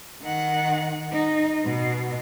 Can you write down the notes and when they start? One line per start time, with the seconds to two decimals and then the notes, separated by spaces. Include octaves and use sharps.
0.22 D#3 F#5
1.12 D#4
1.65 B2